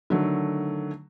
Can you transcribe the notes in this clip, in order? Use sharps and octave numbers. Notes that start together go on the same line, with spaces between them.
D3 D#3 F#3 A3